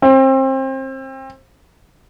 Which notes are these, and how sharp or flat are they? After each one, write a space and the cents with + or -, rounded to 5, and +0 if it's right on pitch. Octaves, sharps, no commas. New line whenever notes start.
C4 +30